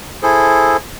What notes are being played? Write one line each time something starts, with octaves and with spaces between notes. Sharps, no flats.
E4 G#4 A4 C5